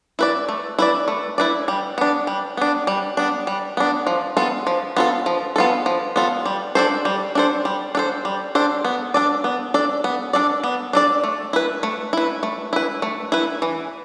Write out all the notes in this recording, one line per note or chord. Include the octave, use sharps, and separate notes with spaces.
E4 B4 D5
A3
E4 B4 D5
A3
E4 B4 D5
G3
B3 D4
G3
B3 D4
G3
B3 D4
G3
B3 D4
F3
B3 F4 A4
F3
B3 F4 A4
F3
B3 F4 A4
F3
B3 F4 A4
G3
D4 A4 C5
G3
D4 A4 C5
G3
D4 A4 C5
G3
D4 A4 C5
B3
D4 A4 D5
B3
D4 A4 D5
B3
D4 A4 D5
B3
D4 A4 D5
A3
E4 B4
A3
E4 B4
A3
E4 B4
A3
E4 B4
E3